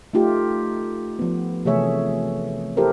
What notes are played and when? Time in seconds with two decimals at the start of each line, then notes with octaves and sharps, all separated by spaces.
0.13 A3 D#4 F4 G4
1.19 F3 B3
1.65 C3 E3 A3 G#4 C#5 E5
2.77 E4 G4 A4 A#4 C5